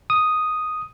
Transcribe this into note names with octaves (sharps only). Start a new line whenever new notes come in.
D#6